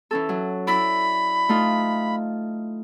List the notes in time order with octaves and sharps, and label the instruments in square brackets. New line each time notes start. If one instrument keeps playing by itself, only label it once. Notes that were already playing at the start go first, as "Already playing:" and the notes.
[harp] E3 C#4 A4
F#3
[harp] E4 D5 [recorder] B5
[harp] A3 D#4 F4